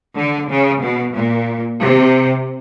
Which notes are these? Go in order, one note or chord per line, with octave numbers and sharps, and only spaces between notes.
D3
C#3
B2
A#2
C3